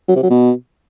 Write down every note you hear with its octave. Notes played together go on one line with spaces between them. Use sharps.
F#3
C3
F#3
B2